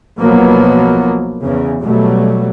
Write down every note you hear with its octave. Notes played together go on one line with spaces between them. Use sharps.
B1 B2 F3 F#3 A#3 B3
E2 C#3
B2 F#3 G3 A3